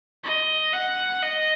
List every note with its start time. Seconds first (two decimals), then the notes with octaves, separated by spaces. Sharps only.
0.24 D#5
0.73 F#5
1.23 D#5